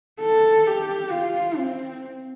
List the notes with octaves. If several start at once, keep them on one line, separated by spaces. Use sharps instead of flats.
A4
G4
F4
C4